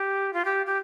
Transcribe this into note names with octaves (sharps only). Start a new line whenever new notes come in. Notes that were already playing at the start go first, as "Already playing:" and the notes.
Already playing: G4
F4
G4
G4